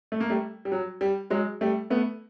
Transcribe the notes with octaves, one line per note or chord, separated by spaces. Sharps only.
A3
A#3
G3 A3
G3
F#3
G3
F#3 G#3
G3 A3
A3 B3